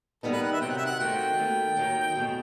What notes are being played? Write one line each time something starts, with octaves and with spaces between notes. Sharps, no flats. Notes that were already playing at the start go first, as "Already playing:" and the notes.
D#2 D#3 G3 B3 D#4 A4
B4
F#5
E5
C3 D#3 F#3 G5
F#5
E5
F#5
D#3 A3 C4 F#4 C5 G5
D#2 D#3 A3
D#2 D#3 F#3
E2 B2 A3